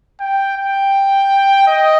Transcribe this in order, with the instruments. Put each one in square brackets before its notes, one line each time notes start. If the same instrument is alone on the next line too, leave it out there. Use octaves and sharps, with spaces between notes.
[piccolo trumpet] G5
G5
D#5